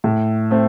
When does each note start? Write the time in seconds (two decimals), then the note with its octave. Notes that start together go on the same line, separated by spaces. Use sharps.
0.04 A2
0.51 A3 C4